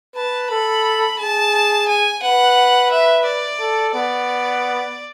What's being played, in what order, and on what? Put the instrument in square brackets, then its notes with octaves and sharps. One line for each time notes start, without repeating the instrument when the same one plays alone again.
[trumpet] B4 [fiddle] A5
[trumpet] A4 [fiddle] B5
[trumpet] G#4 [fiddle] A5
[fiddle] G#5
[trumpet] B4 [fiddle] F#5
[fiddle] E5
D5
[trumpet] A4
[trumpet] B3 [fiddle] D5